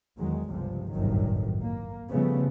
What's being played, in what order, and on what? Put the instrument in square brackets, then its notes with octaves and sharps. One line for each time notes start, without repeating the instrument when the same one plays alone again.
[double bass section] E2 D#3 F#3 G#3
G1 C#2 C3 F3
G1 C2 F#2 A2 D#3 F#3
A#3
C#3 F3 G3 A3 B3